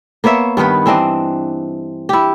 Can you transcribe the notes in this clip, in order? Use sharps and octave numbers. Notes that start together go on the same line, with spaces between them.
A#3 B3 C#5 E5
G2 D#3 B3 B4
E3 C4 D4 D#5
E4 G4